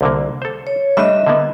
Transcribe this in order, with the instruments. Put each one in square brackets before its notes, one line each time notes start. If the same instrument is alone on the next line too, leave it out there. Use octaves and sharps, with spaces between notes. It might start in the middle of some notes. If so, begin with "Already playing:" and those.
[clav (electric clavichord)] C2 D3 A#3
A4 C5
[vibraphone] C#5
[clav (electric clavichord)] G3 A3 D4 [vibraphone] D#5 E5
[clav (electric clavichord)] D3 A#3 B3